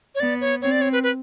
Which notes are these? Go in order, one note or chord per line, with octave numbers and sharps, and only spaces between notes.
C#5
B3 D5
C#5
C4 C#5
D5
C#5
B4
B4